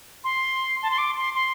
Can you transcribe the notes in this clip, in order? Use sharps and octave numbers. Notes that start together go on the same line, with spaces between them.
C6
A5
C6
D6
C6
C6